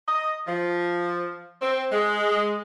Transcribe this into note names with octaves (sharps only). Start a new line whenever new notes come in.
D#5
F3
C4
G#3